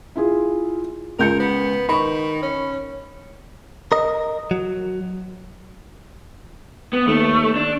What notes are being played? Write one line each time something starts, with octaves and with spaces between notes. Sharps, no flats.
E4 F4 G#4
C#2 A#4 G6 C#7
B3
D#3 B5 C#6
C#4
A#4 D#5
F#3
B3
D#2 A3
D4